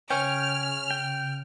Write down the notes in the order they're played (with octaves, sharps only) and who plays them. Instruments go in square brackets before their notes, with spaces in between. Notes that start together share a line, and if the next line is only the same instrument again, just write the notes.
[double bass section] C#3 [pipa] C#4 [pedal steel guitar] G5 [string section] F6
[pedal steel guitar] G5